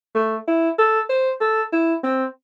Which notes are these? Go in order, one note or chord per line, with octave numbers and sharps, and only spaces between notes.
A3
E4
A4
C5
A4
E4
C4